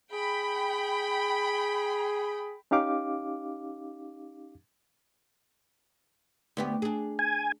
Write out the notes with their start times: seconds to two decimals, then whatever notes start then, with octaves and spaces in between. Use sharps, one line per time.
0.12 G#4 G5 B5
2.71 C#4 D#4 G4 F5 D6
6.57 D2 B3 G4
6.82 D4 G#4
7.19 G#5